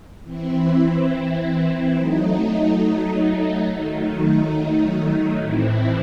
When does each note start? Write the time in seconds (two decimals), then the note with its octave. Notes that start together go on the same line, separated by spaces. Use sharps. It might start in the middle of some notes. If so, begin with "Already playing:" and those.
0.23 E3 C4 E4
1.95 F#3 A3 D#4
3.66 D#3 F#3 A3 D#4
5.38 A2 E3 C4 E4